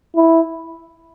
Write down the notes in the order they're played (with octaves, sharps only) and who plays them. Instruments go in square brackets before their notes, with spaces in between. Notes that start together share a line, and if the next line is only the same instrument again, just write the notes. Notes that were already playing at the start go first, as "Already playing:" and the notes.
[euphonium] E4